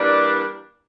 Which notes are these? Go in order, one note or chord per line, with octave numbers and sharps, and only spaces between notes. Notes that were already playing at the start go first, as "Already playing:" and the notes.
Already playing: E3 G3 A#3 D4